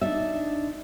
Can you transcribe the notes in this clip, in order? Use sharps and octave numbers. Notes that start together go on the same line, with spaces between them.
D4 D#4 E5